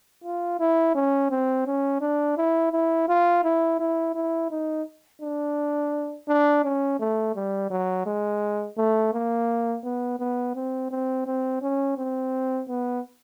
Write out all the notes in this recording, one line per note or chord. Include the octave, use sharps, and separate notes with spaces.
F4
E4
C#4
C4
C#4
D4
E4
E4
F4
E4
E4
E4
D#4
D4
D4
C#4
A3
G3
F#3
G#3
A3
A#3
B3
B3
C4
C4
C4
C#4
C4
B3